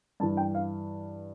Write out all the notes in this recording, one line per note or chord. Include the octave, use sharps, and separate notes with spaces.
G2 E3 A5
G5
F5